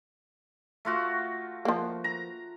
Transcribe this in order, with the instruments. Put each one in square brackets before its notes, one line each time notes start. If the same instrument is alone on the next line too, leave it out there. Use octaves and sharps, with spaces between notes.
[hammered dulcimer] A3 F4 F#4
[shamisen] F3 A#3
[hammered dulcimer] A#5